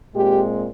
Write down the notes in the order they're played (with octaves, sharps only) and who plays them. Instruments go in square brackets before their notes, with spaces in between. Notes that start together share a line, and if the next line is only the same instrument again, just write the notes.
[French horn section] A#2 G#3 C4 G4